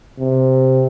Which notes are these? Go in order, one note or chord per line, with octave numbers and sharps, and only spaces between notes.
C3